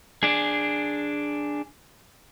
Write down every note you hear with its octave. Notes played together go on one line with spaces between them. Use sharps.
D4 G#4